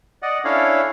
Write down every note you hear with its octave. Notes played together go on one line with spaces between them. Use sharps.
D5 D#5 F#5
C#4 D4 E4 A4 C#5 F5